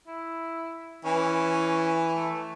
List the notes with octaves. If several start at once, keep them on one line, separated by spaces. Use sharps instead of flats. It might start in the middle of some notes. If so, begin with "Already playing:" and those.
E4
E3 C#4
A3